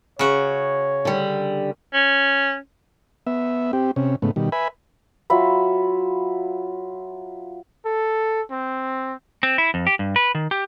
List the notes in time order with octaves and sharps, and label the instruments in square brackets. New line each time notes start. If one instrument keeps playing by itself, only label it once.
[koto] C#3 F#4 [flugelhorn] C#5
[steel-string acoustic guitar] D3 G3
[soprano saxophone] C#4
[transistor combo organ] B3 E5
C4 G4
C3 C#4
G#2 C#3 A3 B3
B2 D#3 G3
B4 E5 G#5 B5
[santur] F#3 F4 E5 B5
[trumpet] A4
C4
[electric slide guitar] C4
E4
F2
G4
G2
B4
D#3
G4